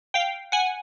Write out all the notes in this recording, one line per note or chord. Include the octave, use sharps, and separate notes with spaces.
F5 G5
F#5 G#5